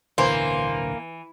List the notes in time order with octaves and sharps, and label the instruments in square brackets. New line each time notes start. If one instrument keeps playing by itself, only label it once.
[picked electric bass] D1 B1 D3 [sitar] E3 [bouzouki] A#3 [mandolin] C5